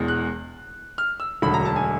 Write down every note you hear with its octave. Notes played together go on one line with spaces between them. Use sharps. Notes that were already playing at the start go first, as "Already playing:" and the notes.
Already playing: E1 E2 B2 G#3
F#6
F6
E6
E1 D2 D3 F#3 B5
A#5
A5
G#5